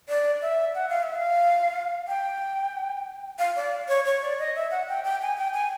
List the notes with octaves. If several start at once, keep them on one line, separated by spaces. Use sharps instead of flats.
D5
E5
F#5
F5
E5
F5
G5
F5
D5
C#5
C#5
D5
D#5
E5
F#5
G5
G5
G#5
G5
G#5